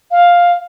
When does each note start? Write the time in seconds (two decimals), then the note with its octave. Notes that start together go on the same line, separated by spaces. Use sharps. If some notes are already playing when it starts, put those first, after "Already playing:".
0.11 F5